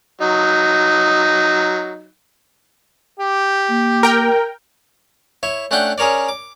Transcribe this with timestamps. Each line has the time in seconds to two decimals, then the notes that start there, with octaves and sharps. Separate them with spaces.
0.21 F#3 D#4
3.19 G4
3.69 A#3
4.03 A#4 G5
5.43 E4 C#5 E5
5.71 A3 C#4 D4 D5 F#5 G5
5.98 C#4 G#4 A#4 C#5 D5
6.28 D6